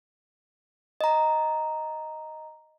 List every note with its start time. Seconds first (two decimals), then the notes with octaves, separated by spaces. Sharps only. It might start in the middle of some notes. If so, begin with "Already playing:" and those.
1.01 D#5 A#5